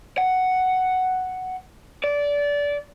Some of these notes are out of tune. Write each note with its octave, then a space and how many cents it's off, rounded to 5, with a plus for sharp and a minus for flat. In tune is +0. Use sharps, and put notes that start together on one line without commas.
F#5 +5
D5 -20